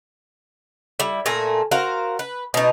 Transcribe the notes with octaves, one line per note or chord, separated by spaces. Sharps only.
G3 E4
A#2 A3 G#5 A#5
F#4 A#4 C5 F5
B4
B2 D#4